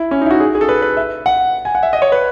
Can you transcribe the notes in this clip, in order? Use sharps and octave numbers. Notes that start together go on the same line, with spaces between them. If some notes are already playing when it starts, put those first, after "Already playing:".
Already playing: E4
C#4
D#4
E4
F#4
G#4
G#4
A4
B4
B4
E5
F#5
G#5
F#5
E5
D#5
C#5
B4